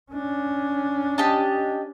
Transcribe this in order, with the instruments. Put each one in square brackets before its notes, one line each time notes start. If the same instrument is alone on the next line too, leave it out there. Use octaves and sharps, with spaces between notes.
[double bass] C#4 D4
[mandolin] G4 D#5 A5